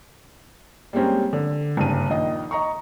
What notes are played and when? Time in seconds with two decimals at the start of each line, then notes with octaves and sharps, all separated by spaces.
0.93 G3 G#3 A#3 C4 C#4
1.33 D3
1.77 F#1 G2 D#7
2.10 A#1 D#3 D#5
2.51 D#5 A#5 C#6